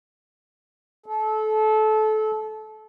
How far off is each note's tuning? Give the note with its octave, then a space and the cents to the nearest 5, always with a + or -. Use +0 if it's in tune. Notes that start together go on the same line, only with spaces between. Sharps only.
A4 -25